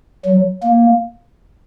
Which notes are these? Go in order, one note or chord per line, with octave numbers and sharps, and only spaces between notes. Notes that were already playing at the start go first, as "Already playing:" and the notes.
F#3
A#3